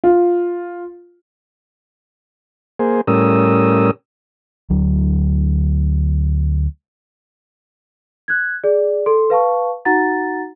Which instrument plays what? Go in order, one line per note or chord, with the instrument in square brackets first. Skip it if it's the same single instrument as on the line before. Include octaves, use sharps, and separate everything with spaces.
[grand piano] F4
[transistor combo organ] A#3 G#4 C5
A2 G3 C#4 A#4 D#6 E6
[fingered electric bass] D2 F#3
[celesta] F#6 G#6
G#4 D5
A4 C6
B4 F5 A5 C#6
D#4 F#4 F#5 A#5 A6